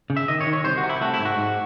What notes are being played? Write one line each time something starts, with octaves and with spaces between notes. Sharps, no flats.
C#3
E5
D#3 D#5
C#5
D#3
C#5
C2 C5
F#4
C3
E4
A3 F#4
E4
G#2
F#4
G#2